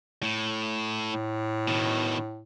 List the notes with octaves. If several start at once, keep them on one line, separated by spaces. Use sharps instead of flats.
A2
A2
B2 D#3